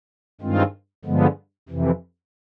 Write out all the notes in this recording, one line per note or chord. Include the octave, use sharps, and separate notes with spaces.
G2 D#3 G#3 C4 F4
G2 D3 F3 G#3 B3
F2 C3 E3